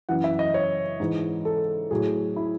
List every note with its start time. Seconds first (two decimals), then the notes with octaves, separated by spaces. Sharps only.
0.09 F#2 E3 F#5
0.24 E5
0.39 D#5
0.54 C#5
1.00 G#2 E3
1.45 A4
1.91 A2 F#3 G#4
2.36 E4